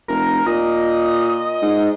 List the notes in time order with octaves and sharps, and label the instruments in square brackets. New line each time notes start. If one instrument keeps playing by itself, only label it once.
[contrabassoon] F1 [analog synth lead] A#4
[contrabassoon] A#2 [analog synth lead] D#5
[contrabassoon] G#2